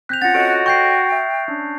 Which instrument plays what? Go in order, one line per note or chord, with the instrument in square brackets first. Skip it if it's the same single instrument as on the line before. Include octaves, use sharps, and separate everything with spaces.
[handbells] C4 A#6 B6 [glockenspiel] F#6 G6 F7
[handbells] C#4 F4 [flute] F#5 [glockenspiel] A6 A#6
[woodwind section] F#4 [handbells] A4 C#5 D#5 [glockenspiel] D7
[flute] G5 [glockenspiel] C#6 G6 C7
[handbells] E5
C#4 D4